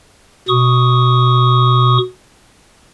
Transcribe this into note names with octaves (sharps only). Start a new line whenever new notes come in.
B2 C#6 D#6